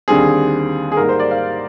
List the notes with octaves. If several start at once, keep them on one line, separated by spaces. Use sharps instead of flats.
D#2 D3 G3 C4 G#4
G#4
G#2 G3 A#3 A#4
C5
D5
F5